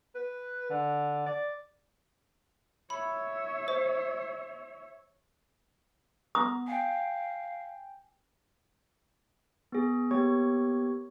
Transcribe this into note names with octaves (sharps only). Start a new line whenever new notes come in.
B4
D3
D5
C#5 E5 B5
C5
B3 A#5 D#6
F5 G5 G#5
B3 G#4
A#3 B3 G4 C#5 C#6 G#6